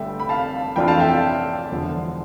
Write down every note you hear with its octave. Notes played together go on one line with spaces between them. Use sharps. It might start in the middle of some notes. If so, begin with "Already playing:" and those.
Already playing: G1 G2 D3 A3 E5 G5
B5
F5 A5
F2 E3 A3 D4 F4 G5 B5
F5 A5
E5 G5
E1 E2 D3 F3